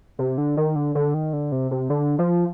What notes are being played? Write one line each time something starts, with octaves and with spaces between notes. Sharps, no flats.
C3
D3
D#3
D3
D3
D#3
D3
C3
C3
D3
F3